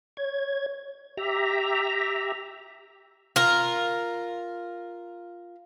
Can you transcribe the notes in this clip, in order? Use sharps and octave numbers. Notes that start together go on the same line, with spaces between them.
C#5 G#6
G4 E5 A#5
F4 A#4